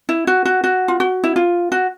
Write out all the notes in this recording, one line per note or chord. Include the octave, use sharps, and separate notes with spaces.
E4
F#4
F#4
F#4
F4
F#4
E4
F4
F#4